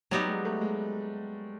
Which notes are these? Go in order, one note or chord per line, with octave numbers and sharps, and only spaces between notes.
F#3 G3 B3 D#4 G4
G#3
A3
G#3